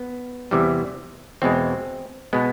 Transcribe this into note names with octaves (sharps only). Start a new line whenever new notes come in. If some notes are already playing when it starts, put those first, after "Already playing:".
Already playing: B3
E2 C3 E3 G3
E2 B2 G#3 C4
B2 G#3 B3